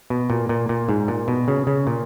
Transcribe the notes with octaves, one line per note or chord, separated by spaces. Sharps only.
B2
A#2
A#2
A#2
G#2
A#2
B2
C#3
C#3
A#2